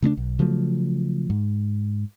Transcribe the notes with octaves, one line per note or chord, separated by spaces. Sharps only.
C#3 A3 C4 D4
B1
C#3 F3 F#3 A3
G#2